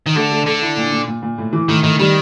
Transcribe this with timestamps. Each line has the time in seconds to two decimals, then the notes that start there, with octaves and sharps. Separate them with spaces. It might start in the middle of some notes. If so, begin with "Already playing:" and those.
0.06 D#3
0.16 D3 A3
0.31 A3
0.46 D3 A4
0.62 E4
0.77 A#2
0.92 A#2
1.08 A#2
1.23 A#2
1.38 A2
1.53 E3
1.68 A2 D#3
1.83 A2 D#3
1.99 D#3 G3